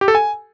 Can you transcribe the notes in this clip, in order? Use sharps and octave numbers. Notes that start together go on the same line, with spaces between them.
G4
A4
G#5